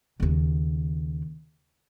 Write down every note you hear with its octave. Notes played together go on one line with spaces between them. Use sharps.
D#2 C#3